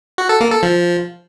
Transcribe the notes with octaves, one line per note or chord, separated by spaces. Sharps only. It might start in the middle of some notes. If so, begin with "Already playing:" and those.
F#4
A4
A#3
A4
F3